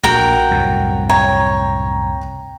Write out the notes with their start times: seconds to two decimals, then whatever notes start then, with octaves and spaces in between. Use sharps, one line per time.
0.03 A#1 F#4 A#4 G5
0.51 C2 F#2 A2
1.09 C#5 G5 A#5